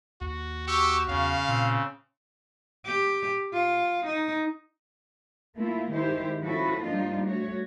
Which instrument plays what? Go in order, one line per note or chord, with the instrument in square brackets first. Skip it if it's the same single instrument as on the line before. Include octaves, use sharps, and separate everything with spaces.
[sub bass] D#2 [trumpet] F#4
[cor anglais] F#4 [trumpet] G4 [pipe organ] C#6 E6
[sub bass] E2 [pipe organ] C#3 [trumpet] F5
[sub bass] A#2 [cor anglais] C4
[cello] G4
F4
D#4
[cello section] A3 A#3 E4 F4
D#3 G#3 E4 G4 C5
F3 C#4 E4 F#4 A4 B4
F3 G3 A#3 D4 D#4 F4
A3 F#4 C#5